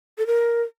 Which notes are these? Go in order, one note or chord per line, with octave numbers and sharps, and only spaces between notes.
A4
A#4